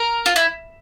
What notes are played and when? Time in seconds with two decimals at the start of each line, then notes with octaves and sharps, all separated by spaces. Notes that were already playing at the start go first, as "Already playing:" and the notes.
Already playing: A#4
0.26 F4
0.36 E4